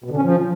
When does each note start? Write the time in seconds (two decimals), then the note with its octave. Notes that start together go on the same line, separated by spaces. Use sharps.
0.04 B2
0.10 D3
0.17 C#4
0.23 F3